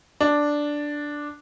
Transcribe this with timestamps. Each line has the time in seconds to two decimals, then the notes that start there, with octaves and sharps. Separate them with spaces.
0.21 D4